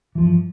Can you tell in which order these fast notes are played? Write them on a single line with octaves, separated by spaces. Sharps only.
E3 F3 G2